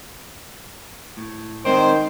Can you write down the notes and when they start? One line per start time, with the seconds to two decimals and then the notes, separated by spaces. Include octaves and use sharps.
1.17 A2
1.65 D#3 G#3 C4 C5 D5